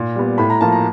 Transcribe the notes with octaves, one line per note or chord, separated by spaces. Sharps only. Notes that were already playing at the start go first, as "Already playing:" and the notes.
Already playing: A#2
G3 B3
A2 B5
A#5
F3 A#3 A5
A#5